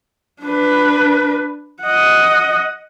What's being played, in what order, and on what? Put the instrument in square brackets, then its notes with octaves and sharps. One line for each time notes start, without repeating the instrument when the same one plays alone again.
[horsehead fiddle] D4 B4
D#5 F#5